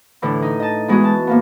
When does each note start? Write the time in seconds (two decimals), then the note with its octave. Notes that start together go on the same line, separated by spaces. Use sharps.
0.22 A2 D3 E3
0.42 D#4
0.60 D#5 A5
0.88 E3 G#3 B3 F#4 G#4
1.04 A5
1.27 A2 A#3 B3